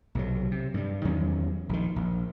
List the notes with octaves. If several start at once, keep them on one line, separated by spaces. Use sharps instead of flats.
B1 C3 F#3
C3
G2 G3
E2 D#3 F#3 C#4
A#1 D#3
A#1